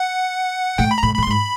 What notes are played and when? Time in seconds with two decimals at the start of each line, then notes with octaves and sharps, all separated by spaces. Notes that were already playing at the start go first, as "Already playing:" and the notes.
Already playing: F#5
0.78 A2 G5
0.91 B5
0.98 A#5
1.02 A2 B5
1.15 A2 B5
1.23 C6
1.27 G#2
1.31 B5